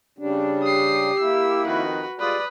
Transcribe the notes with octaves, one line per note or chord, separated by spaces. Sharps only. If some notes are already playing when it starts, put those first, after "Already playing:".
C#3 G3 D4
G4 D#6 C7
A#3 E4 E6
F2 D#3 F#4 B4
G3 G#3 F4 B4 D5 D#6